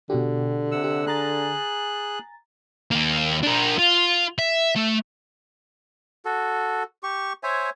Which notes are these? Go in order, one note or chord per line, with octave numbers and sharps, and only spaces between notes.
B2 D3 F#4 G4
C3 F#5 E6
G4
G#4 G#5 A#5 F#6 A6
D#2 A#3
D4 A#4
F4
E5
A3
F#4 A4
G4 C#6
C5 C#5 E5 G#5